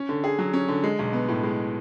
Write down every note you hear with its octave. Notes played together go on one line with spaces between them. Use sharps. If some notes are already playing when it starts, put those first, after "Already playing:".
Already playing: C#4
D3
G#4
F#3
C#4
D3
G#3
B1
B3
A2
G#3